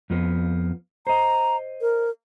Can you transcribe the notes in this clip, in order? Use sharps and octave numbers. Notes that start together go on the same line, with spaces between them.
F2 F3 B3
C5 D#5 A#5
A#4